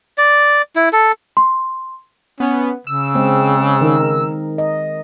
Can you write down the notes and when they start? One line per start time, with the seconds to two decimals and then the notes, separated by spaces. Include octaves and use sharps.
0.18 D5
0.76 E4
0.93 A4
1.37 C6
2.40 B3 C#4
2.87 C#3 E6
3.15 G#3 C4
3.81 D#3 D#4 A#4
4.58 D#5